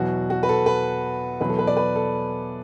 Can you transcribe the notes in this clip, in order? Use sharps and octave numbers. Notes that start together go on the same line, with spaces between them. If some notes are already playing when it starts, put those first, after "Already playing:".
Already playing: E2 B2 F#3 F#4
F#4
B4
A4
B4
E2 B2 F#3 B4
A4
B4
D5
B4
A4